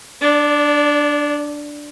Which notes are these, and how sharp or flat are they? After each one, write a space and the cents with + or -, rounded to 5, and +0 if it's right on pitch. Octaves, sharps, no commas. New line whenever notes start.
D4 +0 D5 -35